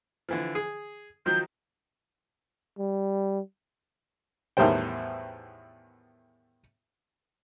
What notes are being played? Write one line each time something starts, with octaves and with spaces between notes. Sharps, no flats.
D3 E3 F3
G#4
D#3 F3 F#3 G6
G3
E2 A2 D#3 G3 C5 G5